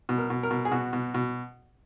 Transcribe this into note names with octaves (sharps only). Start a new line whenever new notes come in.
B2
A#4
B2
A#4
B2
G#4
B2 F#4
B2
B2